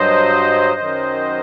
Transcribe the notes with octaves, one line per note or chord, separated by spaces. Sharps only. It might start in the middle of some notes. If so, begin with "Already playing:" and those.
Already playing: G2 F#3 C5 D#5
F#2 D#3 F#3